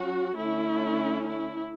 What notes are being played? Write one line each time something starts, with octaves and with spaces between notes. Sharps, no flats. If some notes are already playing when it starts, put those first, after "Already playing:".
Already playing: F#3 C#4 F#4
D3 A3 C#4 E4
E4